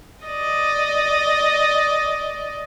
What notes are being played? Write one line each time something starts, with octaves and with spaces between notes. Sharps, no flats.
D5 D#5